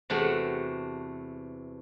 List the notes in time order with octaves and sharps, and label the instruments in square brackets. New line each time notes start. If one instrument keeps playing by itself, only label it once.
[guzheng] E2 C3 A3 F#4 F#5